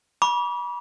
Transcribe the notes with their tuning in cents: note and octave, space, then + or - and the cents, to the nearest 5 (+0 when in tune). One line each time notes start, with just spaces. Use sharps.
B5 -35 D6 -35